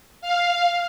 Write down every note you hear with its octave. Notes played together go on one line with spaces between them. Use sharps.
F5